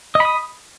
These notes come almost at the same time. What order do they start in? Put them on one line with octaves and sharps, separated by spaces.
D#5 B5 D#6